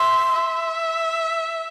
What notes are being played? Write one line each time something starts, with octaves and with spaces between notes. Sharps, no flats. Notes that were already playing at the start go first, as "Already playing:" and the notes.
Already playing: E5 C6
E5